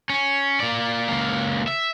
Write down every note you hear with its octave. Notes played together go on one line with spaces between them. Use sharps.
C#4
A#3 D5
C#2 A#3
E5